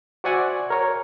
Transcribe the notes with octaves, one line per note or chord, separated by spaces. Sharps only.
F#4 C5 D5 E5 F#5 G#5
A#4 C#5